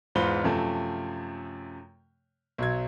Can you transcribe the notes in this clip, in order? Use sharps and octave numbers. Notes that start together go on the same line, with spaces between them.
E2 G#2 F4 C5 B5 G7
F#2 C3 F3 A3
B1 F#3 G#6